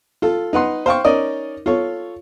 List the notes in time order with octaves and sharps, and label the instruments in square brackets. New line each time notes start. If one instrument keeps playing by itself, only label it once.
[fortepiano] F4 A4
D#4 B4 F#5 C6
C5 F5 G5 C#6
C#4 D#4 A#4 D5 D#5
F4 A4 C#5